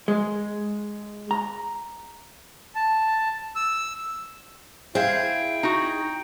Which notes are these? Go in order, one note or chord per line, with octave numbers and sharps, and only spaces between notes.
G#3
A#5
A5
E6
E4 G#4 C5 E5 F5 G5
D#4 F#4